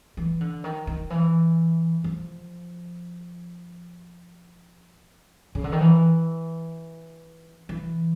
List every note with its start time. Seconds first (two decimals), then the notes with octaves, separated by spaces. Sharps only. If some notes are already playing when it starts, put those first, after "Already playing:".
0.17 E3
0.41 D3
0.64 D#3
0.87 D#3
1.10 E3
2.04 F3
5.55 C#3
5.64 D3
5.72 D#3
5.81 E3
7.69 E3